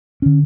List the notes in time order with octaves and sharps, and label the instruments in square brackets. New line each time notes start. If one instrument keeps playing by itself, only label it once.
[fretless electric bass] D3 C#4